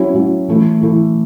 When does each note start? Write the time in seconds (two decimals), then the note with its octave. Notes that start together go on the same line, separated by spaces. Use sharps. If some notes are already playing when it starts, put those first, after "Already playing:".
Already playing: F#3 C#4 E4
0.14 F#3 C#4 E4
0.48 E3 A3 E4
0.81 E3 A3 E4